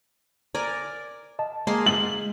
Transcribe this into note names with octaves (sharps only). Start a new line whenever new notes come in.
A#4 D5 G#5
D#5 A5
G#3 A#3 G#4 C6
G#3 F#7